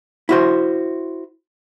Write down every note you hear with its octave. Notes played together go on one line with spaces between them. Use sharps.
E4 F#4 C5